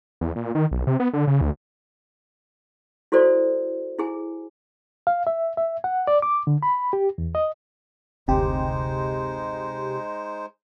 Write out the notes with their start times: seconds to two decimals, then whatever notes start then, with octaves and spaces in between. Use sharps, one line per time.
0.21 E2
0.36 A#2
0.55 D#3
0.71 B1
0.87 C3
1.00 B3
1.13 D3
1.27 C#3
1.41 D2
3.12 E4 F#4 A4 C5 D5
3.99 E4 G#4 G#5
5.07 F5
5.27 E5
5.57 E5
5.84 F#5
6.07 D5
6.22 D6
6.47 D3
6.63 B5
6.93 G4
7.18 E2
7.35 D#5
8.28 F#1 D2 C3 G#3 D#4 G4 C5